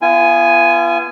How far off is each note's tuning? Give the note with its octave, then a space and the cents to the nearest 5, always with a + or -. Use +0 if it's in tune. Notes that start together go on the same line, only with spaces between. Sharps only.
B3 +0 F4 -40 G#5 +0